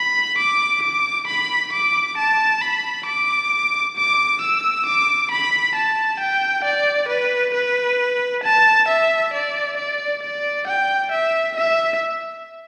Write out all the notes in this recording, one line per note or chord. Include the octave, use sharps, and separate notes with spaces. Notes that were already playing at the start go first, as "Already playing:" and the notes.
Already playing: B5
D6
D6
B5
D6
A5
B5
D6
D6
E6
D6
B5
A5
G5
D5
B4
B4
A5
E5
D5
D5
D5
G5
E5
E5